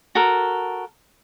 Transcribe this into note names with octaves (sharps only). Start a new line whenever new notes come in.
F#4 A4 A#4